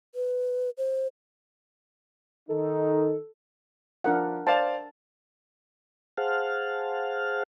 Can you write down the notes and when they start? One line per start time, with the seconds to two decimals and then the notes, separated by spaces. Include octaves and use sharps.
0.15 B4
0.78 C5
2.49 D#3 D#4 A4
4.04 F3 D4 A#4 F#5
4.47 C5 D5 F5 A5
6.17 G#4 C5 F5 F#5 A5 F6